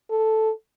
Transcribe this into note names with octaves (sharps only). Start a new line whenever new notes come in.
A4